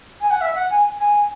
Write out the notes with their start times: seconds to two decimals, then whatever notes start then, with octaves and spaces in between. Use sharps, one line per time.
0.21 G#5
0.30 F#5
0.41 E5
0.55 F#5
0.70 G#5
0.99 G#5